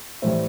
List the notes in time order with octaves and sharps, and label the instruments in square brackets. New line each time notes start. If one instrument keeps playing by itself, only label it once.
[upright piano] A2 E3 G3 C5 E5